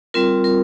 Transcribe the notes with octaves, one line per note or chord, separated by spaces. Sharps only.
G3 C4 F4 A#4
A#4